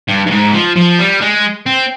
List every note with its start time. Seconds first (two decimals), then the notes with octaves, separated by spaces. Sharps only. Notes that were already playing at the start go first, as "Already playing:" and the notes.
0.09 G2
0.27 G2
0.31 G#2
0.53 F3
0.76 F3
0.99 G3
1.21 G#3
1.66 C4